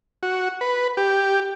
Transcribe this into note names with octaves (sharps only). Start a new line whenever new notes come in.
F#4
B4
G4